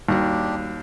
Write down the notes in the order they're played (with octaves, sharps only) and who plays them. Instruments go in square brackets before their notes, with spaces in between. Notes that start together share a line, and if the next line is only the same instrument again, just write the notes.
[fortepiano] D#2 [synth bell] G3 F#4 [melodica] D4 G4